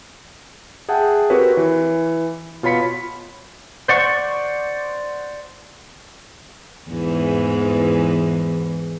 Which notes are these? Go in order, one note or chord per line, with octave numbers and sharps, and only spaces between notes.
G#4 E5 F#5 G5 A5
C4 F#4 G4 A#4 B4 C#5
E3
B2 F4 C#5 B5 B6 C#7
C5 D5 F#5 C#6
E2 G#2 E3